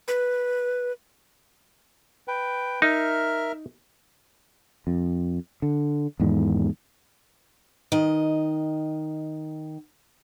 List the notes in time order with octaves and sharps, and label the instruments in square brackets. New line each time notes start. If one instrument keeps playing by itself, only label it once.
[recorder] B4
[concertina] B4 G5
[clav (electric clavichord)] D#4 [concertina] A#4 E5 F6
[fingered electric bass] F2
D3
E2 G#2 D#3
[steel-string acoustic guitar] D#3 D#5